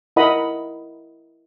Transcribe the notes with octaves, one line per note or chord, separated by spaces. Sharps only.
E4 A#4 D#5 F#5 B5 D#6